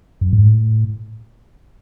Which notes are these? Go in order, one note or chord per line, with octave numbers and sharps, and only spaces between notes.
F#2
G#2
A2